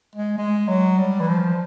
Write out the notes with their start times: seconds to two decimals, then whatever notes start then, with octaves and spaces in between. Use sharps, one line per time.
0.16 G#3
0.38 G#3
0.69 F#3
0.98 G3
1.20 E3
1.28 F3